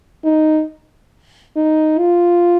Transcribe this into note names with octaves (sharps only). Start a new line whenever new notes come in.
D#4
D#4
F4